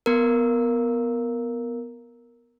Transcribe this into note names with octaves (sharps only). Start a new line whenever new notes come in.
B3 A#4